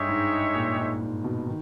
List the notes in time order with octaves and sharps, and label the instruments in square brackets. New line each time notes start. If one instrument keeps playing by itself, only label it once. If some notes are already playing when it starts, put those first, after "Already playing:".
Already playing: [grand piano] G2 [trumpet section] G#3 D#4 G4 C#5 E5
[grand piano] G#2
A#2
G#2
G#2
B2
D#3